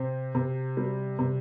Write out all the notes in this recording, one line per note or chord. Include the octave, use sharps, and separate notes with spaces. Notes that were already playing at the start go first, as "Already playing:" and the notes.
Already playing: C3 C4
C3
G3
C3